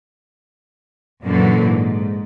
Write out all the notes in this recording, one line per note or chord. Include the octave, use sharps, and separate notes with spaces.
F#2 A#2 D3 E3 F#3
G#2